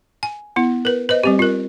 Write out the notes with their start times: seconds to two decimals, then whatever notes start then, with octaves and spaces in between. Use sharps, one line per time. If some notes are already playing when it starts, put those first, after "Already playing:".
0.23 G#5
0.56 B3 E4
0.85 A#4 B4
1.09 B4 C5 D#5
1.24 G3 C4 G4
1.39 F4 A#4